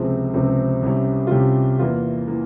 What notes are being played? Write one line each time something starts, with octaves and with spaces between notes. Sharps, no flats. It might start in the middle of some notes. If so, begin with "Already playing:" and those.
Already playing: C#2 C3 F3 C4 G#4
C#2 C3 F3 C4
C2 C3 G3 C#4
F4
C2 C3 G3 C#4 G4
E2 E3 A#3 F4
E3 A#3